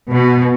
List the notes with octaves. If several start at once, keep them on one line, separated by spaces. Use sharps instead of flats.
B2